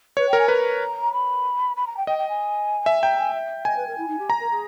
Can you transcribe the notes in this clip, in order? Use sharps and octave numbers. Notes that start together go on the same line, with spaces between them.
B4 C#5
A#4 G5
G#5
B4 A#5
B5
B5
A#5
G5
D#5 G5
G5
G#5
E5
G5 A#5
G#5
E5
D#5 G#5
B4
A#4
E4
D#4
G4
A#5
A#4
G#4